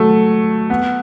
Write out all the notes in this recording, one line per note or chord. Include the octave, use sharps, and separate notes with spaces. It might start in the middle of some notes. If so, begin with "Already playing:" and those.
Already playing: F#3 A3
B3